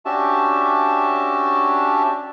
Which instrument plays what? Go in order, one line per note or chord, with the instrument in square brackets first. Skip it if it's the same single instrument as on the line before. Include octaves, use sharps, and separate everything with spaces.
[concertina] C#4 D4 F#4 G4 E5 A5